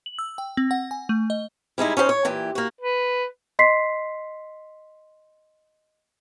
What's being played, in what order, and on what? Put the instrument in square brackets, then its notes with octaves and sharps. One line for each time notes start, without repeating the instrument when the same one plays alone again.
[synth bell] F#7
E6
G5
C4
F#5
G#5
A3
D#5
[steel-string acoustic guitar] G3 G#3 D#4 E4
C#4 D#4 G4 C5
C#5
A#2 E3 G4
A#3 F#4
[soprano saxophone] B4
[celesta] D#5 C6 B6 C7